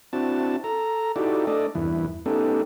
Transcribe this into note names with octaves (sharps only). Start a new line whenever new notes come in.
C4 D4 E4 F#4 A5
A4 A#5
D#4 E4 F#4 G4 A4 D5
A3 D4 A4 D5 D#5
E2 G2 E3 E4
A3 B3 C#4 D#4 G4 A4